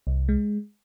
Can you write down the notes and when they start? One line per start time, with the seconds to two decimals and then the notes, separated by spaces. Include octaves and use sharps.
0.07 C2
0.29 G#3